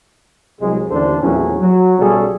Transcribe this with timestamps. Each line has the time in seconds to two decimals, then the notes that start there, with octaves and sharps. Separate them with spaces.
0.61 C2 C3 F#3 G#3
0.89 A1 D#2 D3 D4 A4 C5
1.20 A#1 E2 A2 F#3 C#4
1.59 F#3
1.99 B1 C#3 G3 C#4 G#4 A4